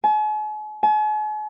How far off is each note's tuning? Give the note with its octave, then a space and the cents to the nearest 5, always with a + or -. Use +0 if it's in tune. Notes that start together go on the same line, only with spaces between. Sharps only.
G#5 +45
G#5 +45